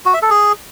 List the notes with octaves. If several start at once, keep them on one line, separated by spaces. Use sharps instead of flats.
F#4
E5
A4
G#4